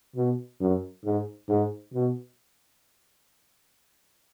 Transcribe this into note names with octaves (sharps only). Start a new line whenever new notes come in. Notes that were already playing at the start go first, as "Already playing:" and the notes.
B2
F#2
G#2
G#2
B2